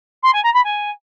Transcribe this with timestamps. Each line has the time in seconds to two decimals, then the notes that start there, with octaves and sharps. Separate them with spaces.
0.23 C6
0.33 G#5
0.43 A#5
0.54 B5
0.64 G#5